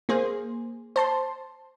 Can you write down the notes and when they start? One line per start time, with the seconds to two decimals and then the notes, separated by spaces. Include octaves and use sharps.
0.09 A#3 G#4 C5
0.96 C5 A5 C6